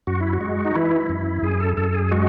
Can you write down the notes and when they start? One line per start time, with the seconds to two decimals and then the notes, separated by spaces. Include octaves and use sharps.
0.07 F#2 F#4
0.21 E4
0.33 F#4
0.41 G#3
0.65 D#4
0.75 E3 E4
1.09 F#2
1.43 F#2 G#4
1.60 A4
1.77 F#2 A4
1.94 G#4
2.12 G#3 F#4